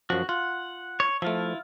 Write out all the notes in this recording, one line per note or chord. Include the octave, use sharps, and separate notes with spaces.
F#2 F3 F#4
F4 F#5
C#5
F3 A3 E4 F4